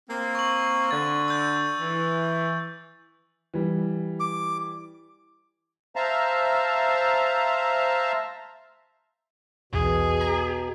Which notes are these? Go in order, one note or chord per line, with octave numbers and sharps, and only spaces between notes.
A#3 C4
C#6 F#7
D3 A6
E6 G6
E3
E3 G3
D6
C5 E5 F5 A5 A#5
B1 E2 B2 G#4
A#5